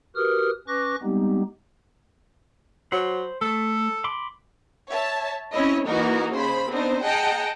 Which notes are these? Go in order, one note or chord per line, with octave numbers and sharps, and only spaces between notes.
F#4 G4 A#4 B4 D#6 F6
C#4 B4 C#6 D6 F#6 A#6
G3 G#3 B3 C4 D#4 G4
F#3 C5 B5
A3 A4
B5 C6 D6
C#5 E5 A5
C4 C#4 E4 C#5 D#5
E3 A#3 D#4 F#4 A#4
C#3 C5 B5
B3 C4 D4 D#4 C5
G#4 D#5 F#5 G5 A5 A#5